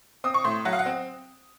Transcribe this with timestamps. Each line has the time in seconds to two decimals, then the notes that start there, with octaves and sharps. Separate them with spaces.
0.24 C4 D#6
0.34 C#6
0.44 A2 C6
0.65 F#3 F#5
0.73 F5
0.79 F#5
0.86 C4